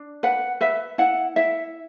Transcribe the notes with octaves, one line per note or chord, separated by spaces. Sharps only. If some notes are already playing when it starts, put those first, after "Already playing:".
Already playing: D4
B4 F#5
B4 E5
E4 F#5
E4 E5